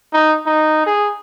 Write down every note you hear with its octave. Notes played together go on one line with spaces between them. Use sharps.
D#4
D#4
G#4